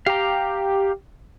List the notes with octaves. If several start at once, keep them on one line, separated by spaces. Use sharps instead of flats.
G4 F5 A#5